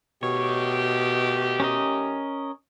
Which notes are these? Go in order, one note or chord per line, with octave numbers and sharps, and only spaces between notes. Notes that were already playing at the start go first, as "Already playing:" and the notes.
B2 D#3 A3 G4 C#5
C#4 A#4 D#5